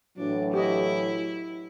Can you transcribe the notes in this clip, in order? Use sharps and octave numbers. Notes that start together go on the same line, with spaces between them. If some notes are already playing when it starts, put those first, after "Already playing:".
A2 E3 F#3 D4
E4 G4 C#5 D#5